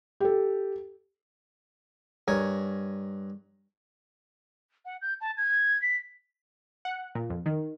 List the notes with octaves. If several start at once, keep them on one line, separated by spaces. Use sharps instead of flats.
G4 A4
G2 A#4 C#5 G#5
F#5
G6
A5
G#6
B6
F#5
A#2
F2
D#3